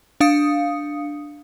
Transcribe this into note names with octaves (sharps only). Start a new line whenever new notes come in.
D4 F5 D#6 C#7